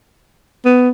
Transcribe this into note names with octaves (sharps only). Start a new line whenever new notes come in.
B3